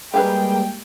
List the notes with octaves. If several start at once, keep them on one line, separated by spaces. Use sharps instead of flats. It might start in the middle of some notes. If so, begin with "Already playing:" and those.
G3 G#3 A#3 G4 G#4 B4 G5